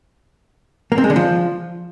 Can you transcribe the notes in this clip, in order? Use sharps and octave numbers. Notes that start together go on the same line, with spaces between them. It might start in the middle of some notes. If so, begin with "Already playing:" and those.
A#3
C4
G#3
D3
F3